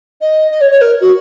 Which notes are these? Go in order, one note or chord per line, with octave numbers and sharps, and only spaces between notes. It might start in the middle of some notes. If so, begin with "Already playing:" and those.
D#5
D#5
C#5
C#5
A#4
F#4